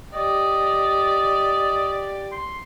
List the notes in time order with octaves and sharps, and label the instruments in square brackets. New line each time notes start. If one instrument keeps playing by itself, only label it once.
[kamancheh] G4 D5 [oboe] D#5
[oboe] C6